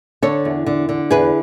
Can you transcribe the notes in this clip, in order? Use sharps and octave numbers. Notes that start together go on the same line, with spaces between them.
D3 A4 C#5
E2
D3
D3
E2 G#4 B4